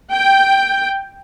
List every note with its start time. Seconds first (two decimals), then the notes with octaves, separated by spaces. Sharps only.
0.12 G5